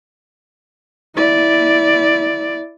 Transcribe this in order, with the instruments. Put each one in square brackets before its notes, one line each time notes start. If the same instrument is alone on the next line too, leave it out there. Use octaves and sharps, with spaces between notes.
[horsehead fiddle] E4 D5